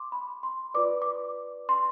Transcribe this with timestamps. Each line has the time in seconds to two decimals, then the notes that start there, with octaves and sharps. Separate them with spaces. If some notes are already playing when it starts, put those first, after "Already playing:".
Already playing: C6 D6
0.12 B5
0.43 C6
0.74 F4 B4 D5 D6
1.02 D6
1.69 C6